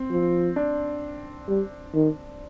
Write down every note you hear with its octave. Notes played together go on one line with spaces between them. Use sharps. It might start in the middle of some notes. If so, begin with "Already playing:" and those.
Already playing: C4
F3
D4
G3
D#3